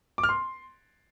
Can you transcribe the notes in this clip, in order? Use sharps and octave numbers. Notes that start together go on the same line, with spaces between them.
D6
F6
C6